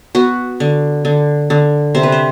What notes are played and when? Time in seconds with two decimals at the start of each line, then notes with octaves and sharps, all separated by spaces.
0.15 B3 F#4
0.60 D3
1.05 D3
1.50 D3
1.95 C3 C5
2.03 B4
2.12 C5